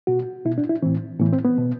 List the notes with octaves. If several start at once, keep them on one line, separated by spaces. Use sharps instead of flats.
B2 F#4
B2 E4
D4
E4
A2 E3 C4
A2 E3 B3
C4
B3
B2